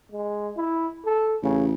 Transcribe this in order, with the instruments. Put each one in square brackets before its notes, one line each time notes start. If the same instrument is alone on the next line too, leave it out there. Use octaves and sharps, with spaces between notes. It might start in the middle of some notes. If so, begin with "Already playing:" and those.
[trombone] G#3
E4
A4
[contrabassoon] A1 [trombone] C#3